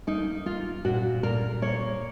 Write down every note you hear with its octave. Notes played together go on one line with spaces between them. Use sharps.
A#3 D#4
A#3 F4
A#2 F#4
A#2 A#4
A#3 C#5